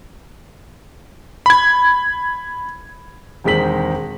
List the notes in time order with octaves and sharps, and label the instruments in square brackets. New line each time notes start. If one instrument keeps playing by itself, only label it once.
[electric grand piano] B5 G#6
[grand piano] E1 D#3 G#3 C4 B6 F#7